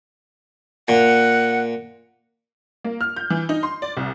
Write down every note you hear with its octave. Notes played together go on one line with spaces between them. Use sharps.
A#2 F#5
A#3
F6
G6
E3
D#4
C6
D5
C2